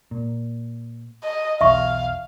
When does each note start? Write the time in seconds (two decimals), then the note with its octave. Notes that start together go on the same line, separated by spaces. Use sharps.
0.11 A#2
1.24 D#5
1.61 B1 E2 E5 F5 C#6